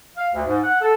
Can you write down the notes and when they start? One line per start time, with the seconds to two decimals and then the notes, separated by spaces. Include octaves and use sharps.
0.17 F5
0.34 D2
0.46 G#2
0.63 F#5
0.81 A4